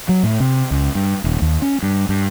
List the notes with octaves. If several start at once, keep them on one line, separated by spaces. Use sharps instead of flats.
F#3
A2
C3
C#2
G2
D#1
D#2
C#4
G2
G2